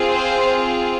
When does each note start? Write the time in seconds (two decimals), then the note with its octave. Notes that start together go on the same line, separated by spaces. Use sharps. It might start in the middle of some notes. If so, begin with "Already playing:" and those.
Already playing: C4 F4 G#4
0.11 C5